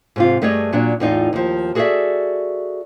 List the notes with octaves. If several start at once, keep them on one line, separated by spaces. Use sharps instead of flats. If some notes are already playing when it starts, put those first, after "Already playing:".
G#2 C3 F4
G2 A3 G#4 C#5 D#5
A#2 F#3 D4
E2 A2 D#4 F4
D#2 F3
F#4 G#4 A4 C#5 D5 E5